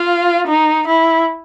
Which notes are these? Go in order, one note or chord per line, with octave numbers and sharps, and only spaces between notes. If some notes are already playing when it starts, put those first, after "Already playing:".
Already playing: F4
D#4
E4